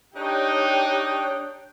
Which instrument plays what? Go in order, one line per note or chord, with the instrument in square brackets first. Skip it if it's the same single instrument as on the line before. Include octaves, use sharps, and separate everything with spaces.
[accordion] D4 G5 F#6 [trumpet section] D#4 [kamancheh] G4 [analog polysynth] C#5 G6